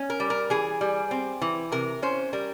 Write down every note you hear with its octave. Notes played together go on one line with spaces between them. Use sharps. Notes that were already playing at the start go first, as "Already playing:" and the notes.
Already playing: C#4
A#4
G3
A#4
E3 G#4
G3
C4
E3
C3 A#4
C#4 C5
G3 A#4